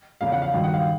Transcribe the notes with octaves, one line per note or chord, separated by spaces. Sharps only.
E2 C#3 F3 F5
F#5
F5
G2 D#3 F#3
F#5
F5